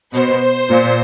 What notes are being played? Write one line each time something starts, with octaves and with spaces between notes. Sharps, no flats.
B2 C5
A#2